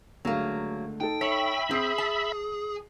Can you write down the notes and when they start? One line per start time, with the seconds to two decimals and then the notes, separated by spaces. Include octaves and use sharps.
0.25 C#2 D3 F#3 A3 A#3
1.00 D#4 A4 G5 A5
1.21 C#5 E5 B5
1.71 C4 G#4 D#6 E6 C7
1.98 A5